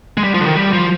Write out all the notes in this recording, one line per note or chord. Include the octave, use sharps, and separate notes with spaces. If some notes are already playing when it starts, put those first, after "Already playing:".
G#3
G3
F3
D3
D#3
G3
F3